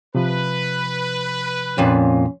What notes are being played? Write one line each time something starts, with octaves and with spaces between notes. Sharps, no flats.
C3 F3 B4
F2 A#2 C#4